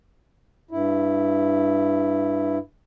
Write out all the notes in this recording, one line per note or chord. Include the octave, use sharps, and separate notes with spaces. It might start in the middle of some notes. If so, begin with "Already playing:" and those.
G2 E4